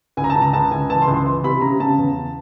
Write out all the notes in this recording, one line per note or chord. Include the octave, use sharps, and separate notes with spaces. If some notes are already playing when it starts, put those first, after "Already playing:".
C#2 G#5
A#5
A5
C#2
A#5
C#2 A5
C#2 G#5
E3 A5
C6
C#2
C6
E3 C6
C3 B5
C#3 A#5
C#3 A5
E2